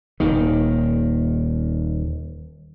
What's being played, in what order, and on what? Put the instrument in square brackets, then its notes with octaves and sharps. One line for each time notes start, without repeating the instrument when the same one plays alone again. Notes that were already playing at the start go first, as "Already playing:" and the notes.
[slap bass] D#1 D#2 D#3